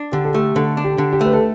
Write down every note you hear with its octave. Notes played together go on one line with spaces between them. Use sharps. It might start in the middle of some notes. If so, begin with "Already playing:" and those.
Already playing: D4
D3 G4
A4
A3 G4
D3 A4
D4
G4
D3
G4
A3 B4
A4